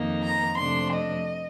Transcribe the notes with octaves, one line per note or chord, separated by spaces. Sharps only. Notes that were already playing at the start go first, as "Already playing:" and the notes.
Already playing: F2 D#3 A#3 D#4
A#5
F2 C3 F3 A3 D4 C6
D#5